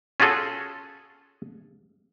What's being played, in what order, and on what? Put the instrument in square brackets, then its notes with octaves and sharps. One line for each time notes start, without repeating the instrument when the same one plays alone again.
[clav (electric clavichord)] C#4 F4 F#4 G#4 A4